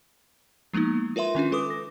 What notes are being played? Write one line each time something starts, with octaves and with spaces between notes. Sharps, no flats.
F3 G#3 A#3 B3 D#4
F4 A#4 B4 E5 C6
D#3 C#4 D4 F4
G#3 A4 B4 D6 D#6
A#6